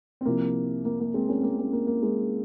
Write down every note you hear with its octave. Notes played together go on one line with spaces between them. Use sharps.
C4
C2 C3 F3 A#3
A#3
A#3
G#3 C4
A#3 C#4
C4
A#3
A#3 C#4
A#3
A#3
G#3